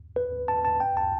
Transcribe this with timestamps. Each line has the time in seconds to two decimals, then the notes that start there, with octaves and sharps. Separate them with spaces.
0.16 B4
0.48 A5
0.65 A5
0.80 G5
0.97 A5